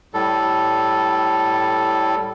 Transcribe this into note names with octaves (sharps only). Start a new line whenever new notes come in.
A2 G3 A4